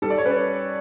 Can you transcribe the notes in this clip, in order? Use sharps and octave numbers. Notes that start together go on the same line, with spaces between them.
G3 A4
D5
C#5
C#4 B4